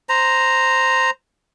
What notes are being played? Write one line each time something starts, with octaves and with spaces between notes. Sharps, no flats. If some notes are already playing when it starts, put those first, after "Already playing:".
C5 A#5